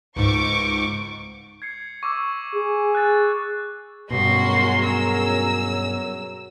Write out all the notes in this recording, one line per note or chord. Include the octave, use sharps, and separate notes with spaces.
C#2 G#2 C#6 D6
G#6 C7 C#7
C#6 D6 E6
G#4
F#6 A6
G2 B2 F#3 C#4 F#4 G#4 A#4 C6
E6